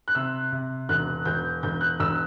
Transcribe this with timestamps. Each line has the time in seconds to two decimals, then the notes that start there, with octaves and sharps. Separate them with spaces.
0.08 F#6
0.15 C3 E6
0.52 C3
0.89 E1 F#6
1.25 E1 G6
1.63 E1 G6
1.81 F#6
2.00 E1 E6